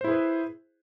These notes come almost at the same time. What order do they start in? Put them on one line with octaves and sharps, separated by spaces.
C5 E4 G#4 B4